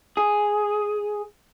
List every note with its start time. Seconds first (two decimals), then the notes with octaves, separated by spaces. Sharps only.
0.17 G#4